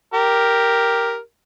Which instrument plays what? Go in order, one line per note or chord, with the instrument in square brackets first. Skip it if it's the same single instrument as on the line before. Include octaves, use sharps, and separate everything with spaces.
[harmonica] G4 A#4